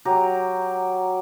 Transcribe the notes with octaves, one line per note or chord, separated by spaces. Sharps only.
F#3 G4 A#5